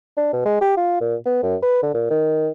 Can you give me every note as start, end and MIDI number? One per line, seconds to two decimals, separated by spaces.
0.17 0.31 62
0.33 0.41 47
0.45 0.60 56
0.61 0.74 67
0.77 0.96 65
1.01 1.16 46
1.25 1.42 59
1.42 1.56 42
1.62 1.80 71
1.82 1.94 50
1.94 2.07 46
2.10 2.49 51